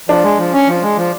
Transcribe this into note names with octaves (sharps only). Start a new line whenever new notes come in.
F3 D4
G#3
F3
C#4
F3
G#3
F3